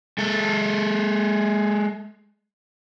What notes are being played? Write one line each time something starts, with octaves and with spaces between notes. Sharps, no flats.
G#3 A4